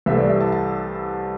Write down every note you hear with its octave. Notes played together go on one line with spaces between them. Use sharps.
C2 C3 E3 A3 E5
D5
E5
A5
A5